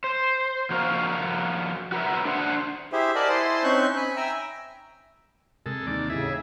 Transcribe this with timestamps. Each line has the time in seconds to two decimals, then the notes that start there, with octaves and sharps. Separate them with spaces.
0.04 C5
0.70 F3 F#4 A#4 F5
1.92 F#4 A#4 B4 E5
2.25 D4 C5 F#5
2.93 E4 G4 G#4 C5 E5
3.15 A#4 D5 D#5 F#5 G#5 A5
3.29 E4 C5 G#5 A5 C6
3.64 C4 C#4 D#4 C#6 F#6 G6
3.97 G#5 B5
4.16 E5 G5 G#5 A#5 E6
5.66 C3 G#3 A4 A#4
5.87 D#2 E3 D#4 D5
6.10 A2 C#3 E4 G4 G#4 E5